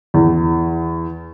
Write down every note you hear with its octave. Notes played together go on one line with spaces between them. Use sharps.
E2